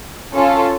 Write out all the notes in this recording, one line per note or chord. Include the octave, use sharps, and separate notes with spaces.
C#4 F4 A4